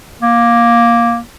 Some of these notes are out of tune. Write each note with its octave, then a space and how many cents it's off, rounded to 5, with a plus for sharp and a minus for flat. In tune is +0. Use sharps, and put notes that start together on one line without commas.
A#3 +10